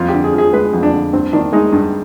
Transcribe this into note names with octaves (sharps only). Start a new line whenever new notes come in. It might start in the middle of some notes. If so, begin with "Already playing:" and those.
Already playing: F2 F4
G4
D3
G#4
F3
G#4
G#3 B4
F2
D4
D3
G2 C4
D#3 D4
G#3 D#4
G2